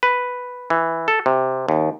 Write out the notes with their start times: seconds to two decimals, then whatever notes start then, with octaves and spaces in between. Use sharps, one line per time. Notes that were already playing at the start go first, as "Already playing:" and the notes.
0.03 B4
0.70 E3
1.08 A4
1.26 C3
1.69 D#2